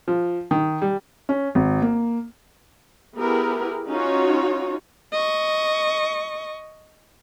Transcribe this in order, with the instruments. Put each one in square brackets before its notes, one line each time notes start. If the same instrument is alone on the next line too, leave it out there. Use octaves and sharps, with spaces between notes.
[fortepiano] F3
D#3
G3
[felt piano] C#4
G#1
A#3
[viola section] B3 E4 G4 G#4 A#4
C#4 D#4 F4 F#4 C#5
[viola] D#5 C#6